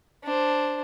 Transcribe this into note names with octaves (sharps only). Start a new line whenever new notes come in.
D4 C5